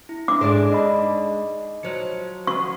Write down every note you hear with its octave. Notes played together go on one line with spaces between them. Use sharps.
E4
D4 E5 D6
G#2 G#3 D4 G#4 A4 C5
D#4 D5 D#5 B5
F3 F#3 C5 C#7
F#4 C#6